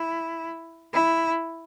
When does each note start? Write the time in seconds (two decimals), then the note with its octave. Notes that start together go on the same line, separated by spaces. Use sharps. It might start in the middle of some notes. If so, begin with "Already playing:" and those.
Already playing: E4
0.93 E4